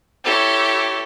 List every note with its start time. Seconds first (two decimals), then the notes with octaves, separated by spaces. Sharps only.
0.24 E4 G4 A4 C#5